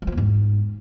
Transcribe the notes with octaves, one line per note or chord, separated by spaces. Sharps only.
F#3
F3
E2
G#2